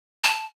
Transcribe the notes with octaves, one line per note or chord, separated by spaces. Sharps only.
A5